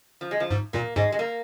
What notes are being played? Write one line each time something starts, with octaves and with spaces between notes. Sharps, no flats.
F3
G#3
F3
G#2
A#2 A#3
G#2 G#3
G#3
A#3